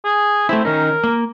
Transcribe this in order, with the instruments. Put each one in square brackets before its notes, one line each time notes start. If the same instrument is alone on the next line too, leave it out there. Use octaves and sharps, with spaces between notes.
[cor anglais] G#4
[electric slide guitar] A3 E4 [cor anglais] C4
[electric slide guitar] D#3 C#4 D#4 [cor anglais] A#4
[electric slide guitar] A#3